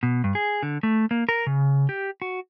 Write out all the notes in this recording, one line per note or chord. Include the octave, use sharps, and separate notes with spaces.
B2
G2
G#4
D3
A3
A#3
A#4
C#3
G4
F#4